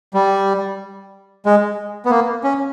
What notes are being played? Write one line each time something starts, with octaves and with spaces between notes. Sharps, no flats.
G3
G#3
B3
A#3
C#4